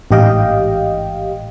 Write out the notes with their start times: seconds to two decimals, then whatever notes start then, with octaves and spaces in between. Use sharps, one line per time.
0.11 A1 G#2 G4 D#5 F5 G5